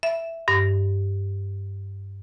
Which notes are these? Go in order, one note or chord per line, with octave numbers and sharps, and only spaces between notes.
E5
G2